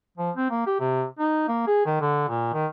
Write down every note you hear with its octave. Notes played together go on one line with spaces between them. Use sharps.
F3
C4
A#3
G4
C3
D#4
A#3
G#4
D#3
D3
A#2
D#3